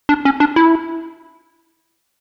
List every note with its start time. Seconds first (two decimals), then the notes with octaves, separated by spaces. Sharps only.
0.09 D4
0.25 C#4
0.40 D4
0.56 E4